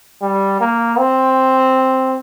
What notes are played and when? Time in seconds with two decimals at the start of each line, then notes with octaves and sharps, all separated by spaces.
0.22 G3
0.61 A#3
0.98 C4